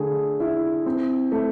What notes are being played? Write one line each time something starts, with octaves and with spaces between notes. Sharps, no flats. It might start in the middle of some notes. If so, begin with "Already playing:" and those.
Already playing: D3 A3 G#4
E4
C4
A3